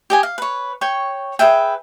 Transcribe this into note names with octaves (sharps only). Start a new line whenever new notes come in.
G4 D#5 G#5
F5
B4 C#5
C#5 G5 C#6
G#4 B4 E5 G5